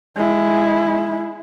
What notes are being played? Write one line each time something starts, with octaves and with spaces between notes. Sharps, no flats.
G#3 E4